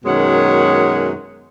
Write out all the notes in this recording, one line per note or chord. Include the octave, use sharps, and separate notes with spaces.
F#2 B2 D#3 G#3 C#5 F#5